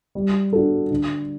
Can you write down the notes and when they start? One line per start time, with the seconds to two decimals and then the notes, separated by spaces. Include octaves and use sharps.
0.15 G3
0.53 D4 F#4 A4
0.91 D3